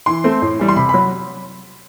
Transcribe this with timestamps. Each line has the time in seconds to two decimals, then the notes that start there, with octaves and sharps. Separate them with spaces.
0.06 E3 C6
0.24 A3 C4
0.42 A2
0.59 E3 G3
0.68 C6
0.76 C3 B5
0.89 F#3 B5